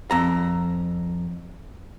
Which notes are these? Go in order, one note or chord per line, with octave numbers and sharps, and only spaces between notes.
F2 A#5